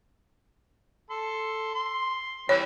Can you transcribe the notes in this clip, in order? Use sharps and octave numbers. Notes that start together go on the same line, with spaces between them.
A4 C6
C6
E3 G3 C4 C#5